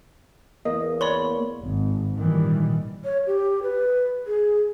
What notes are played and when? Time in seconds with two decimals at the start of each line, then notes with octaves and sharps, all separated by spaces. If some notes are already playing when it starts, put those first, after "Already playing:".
0.65 E2 A#3 D#5
1.01 C#5 D5 B5 C6
1.61 G#1
2.15 A#2 D#3 E3 G3
3.04 C#5
3.27 G4
3.63 B4
4.27 G#4